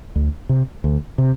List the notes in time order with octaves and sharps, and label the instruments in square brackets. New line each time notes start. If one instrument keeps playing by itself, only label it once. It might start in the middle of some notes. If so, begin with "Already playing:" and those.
[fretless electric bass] D2
C3
D2
C3